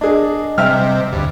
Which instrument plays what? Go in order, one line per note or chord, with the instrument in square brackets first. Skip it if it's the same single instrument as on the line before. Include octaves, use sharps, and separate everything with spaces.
[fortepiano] D4 G#4 [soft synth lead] D#5
[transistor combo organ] C3 [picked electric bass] G3 [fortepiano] E5 G5 F6
[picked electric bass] G1 D2 [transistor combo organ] G2